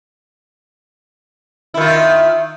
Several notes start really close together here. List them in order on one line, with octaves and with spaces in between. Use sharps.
E4 D#3 F4